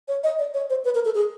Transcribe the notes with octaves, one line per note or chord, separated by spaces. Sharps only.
C#5
D#5
D5
C#5
C5
B4
A#4
A4
G#4